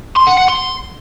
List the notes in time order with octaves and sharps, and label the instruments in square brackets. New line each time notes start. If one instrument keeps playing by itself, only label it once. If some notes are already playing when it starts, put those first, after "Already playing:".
[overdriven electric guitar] C6
F#5
F#5
C6